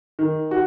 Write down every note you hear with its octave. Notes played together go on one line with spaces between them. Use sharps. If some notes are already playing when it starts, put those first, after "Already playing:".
D#3
F#4